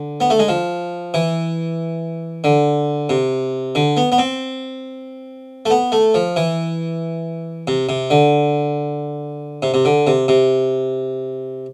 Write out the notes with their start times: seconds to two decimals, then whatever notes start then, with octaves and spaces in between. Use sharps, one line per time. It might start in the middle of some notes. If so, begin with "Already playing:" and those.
Already playing: D3
0.21 B3
0.30 A3
0.39 G#3
0.48 F3
1.14 E3
2.44 D3
3.09 C3
3.75 D3
3.97 B3
4.12 B3
4.18 C4
5.66 A3
5.70 B3
5.92 A3
6.14 F3
6.36 E3
7.67 C3
7.89 C3
8.10 D3
9.62 C3
9.74 C3
9.85 D3
10.07 C3
10.28 C3